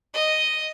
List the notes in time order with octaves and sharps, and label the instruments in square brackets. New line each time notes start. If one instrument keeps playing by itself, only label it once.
[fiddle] D#5